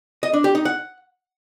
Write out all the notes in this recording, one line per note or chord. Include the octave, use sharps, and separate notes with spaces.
D#5
D4
G4
D#4
F#5